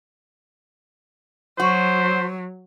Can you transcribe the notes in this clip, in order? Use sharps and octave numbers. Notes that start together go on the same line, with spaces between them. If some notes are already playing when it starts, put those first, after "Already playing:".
F#3 F#4 C5